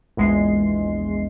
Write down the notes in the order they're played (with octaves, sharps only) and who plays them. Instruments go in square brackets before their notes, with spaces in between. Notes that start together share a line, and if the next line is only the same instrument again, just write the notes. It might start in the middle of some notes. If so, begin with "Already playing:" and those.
[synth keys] A#1 E2 G#3 C6 C7